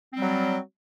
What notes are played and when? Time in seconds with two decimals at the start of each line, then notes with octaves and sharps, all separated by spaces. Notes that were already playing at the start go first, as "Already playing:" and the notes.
0.13 C4
0.18 G3
0.22 F#3